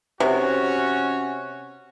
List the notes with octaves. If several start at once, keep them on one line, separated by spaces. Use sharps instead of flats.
C3 C#4 F#4